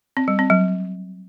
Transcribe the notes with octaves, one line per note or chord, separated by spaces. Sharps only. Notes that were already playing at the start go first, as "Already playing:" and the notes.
C4
G3
C4
F#3